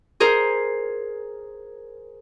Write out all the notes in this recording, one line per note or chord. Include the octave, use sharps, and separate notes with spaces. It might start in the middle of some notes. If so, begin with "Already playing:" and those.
G#4 A#4 C5